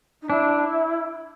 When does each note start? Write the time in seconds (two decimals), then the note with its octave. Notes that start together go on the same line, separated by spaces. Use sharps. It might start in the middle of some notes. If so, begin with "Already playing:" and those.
0.21 D#4
0.29 D4 E4